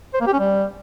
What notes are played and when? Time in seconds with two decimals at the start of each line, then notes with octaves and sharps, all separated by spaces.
0.14 C5
0.20 A#3
0.27 G4
0.33 C#4
0.39 G3